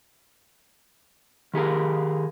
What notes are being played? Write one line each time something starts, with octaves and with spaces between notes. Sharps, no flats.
D#3 G4 G#4 A#4